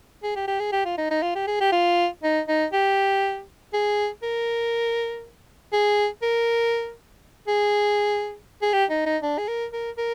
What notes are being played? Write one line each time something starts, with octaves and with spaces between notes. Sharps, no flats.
G#4
G4
G4
G#4
G4
F4
D#4
D#4
F4
G4
G#4
G4
F4
D#4
D#4
G4
G#4
A#4
G#4
A#4
G#4
G#4
G4
D#4
D#4
D4
G#4
A#4
A#4
A#4